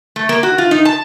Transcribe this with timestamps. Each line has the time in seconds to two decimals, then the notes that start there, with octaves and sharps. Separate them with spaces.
0.16 A3
0.29 A#3
0.43 F#4
0.58 F4
0.71 D#4
0.85 A5